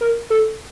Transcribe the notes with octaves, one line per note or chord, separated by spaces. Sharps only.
A#4
A4